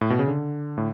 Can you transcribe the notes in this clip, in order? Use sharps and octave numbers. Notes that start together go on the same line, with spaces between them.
A2
B2
C#3
D3
A2